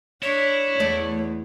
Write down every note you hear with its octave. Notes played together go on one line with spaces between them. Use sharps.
D4 E4 C#5
E2 A3 D5